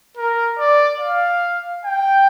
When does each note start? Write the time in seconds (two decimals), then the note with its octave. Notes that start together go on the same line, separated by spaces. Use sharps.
0.17 A#4
0.59 D5
1.01 F5
1.85 G5